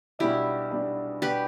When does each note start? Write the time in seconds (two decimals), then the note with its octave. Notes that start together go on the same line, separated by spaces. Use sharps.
0.19 B1 B2 G3 D4 E4 G4
0.71 B1 B2 G3 D4
1.22 B2 G3 D4 G4 B4